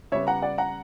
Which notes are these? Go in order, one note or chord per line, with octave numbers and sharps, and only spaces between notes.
C#3 G3 B3 C#5 E5
F#5 A#5
D5 F#5
F#5 A#5